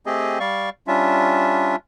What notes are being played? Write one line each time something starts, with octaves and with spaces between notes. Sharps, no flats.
A3 C4 G4 G#4 D#5
G3 D5 F5 C#6
G3 C#4 D4 F4 E5